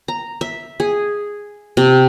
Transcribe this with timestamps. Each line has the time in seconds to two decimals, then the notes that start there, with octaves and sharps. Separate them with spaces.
0.08 A#5
0.41 E5
0.80 G#4
1.77 C3